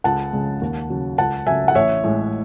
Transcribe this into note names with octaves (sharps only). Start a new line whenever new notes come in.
C#2 F#5 A5
C#3 G#3
D#2
C#3 F#3
C#2 F#5 A5
C#3 F#3 E5 G#5
F#5
A1 C#5 E5
A2 G#3